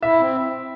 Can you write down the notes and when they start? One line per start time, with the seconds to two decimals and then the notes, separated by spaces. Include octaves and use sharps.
0.03 E4 E5
0.19 C4